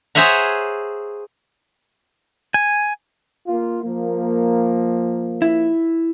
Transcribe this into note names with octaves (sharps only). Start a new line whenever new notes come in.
G#4 C5 C#5 E5 F#5 A#5
G#5
A#3 F4
F3 A#3
E4